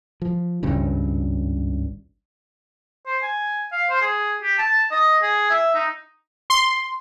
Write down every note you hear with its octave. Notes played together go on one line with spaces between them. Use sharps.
F3
G#1 C#2 G2 C#3
C5
G#5
F5
C5
G#4
G4
A5
D#5
G#4
E5
D#4
C6